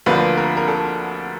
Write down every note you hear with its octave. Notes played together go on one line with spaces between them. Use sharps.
D2 D3 F3 A#3 B4
A#4
A#4
A4